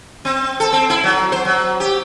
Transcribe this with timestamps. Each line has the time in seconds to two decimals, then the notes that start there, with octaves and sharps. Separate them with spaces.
0.25 C4
0.60 A4
0.72 C4
0.90 E4
1.04 F#3
1.32 C5
1.45 F#3
1.80 G4